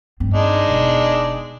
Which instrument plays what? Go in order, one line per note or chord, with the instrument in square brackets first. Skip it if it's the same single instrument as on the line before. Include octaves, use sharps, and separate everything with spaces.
[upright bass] G2 C4
[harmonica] G#3 D4 D#4
[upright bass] E1